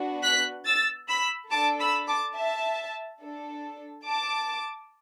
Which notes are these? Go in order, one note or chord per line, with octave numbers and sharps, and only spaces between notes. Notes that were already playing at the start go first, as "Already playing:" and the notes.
Already playing: B3 D4 F#4
F#6 B6
E6 A6
B5 E6
D4 A4 A5 D6
B5 E6
A5 D6
E5 A5
D4 A4
A5 D6